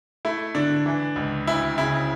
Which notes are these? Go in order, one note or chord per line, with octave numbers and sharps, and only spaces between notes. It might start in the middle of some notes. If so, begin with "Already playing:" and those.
A3 E4
D3 D4
E3
C#2
D2 E4
C#3 E4